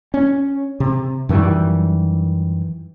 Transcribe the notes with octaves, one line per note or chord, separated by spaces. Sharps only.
C#4
C3
F#2 D#3 E3 G3